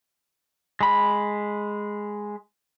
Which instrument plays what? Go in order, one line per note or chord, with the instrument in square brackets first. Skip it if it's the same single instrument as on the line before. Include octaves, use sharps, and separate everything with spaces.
[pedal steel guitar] G#3 B5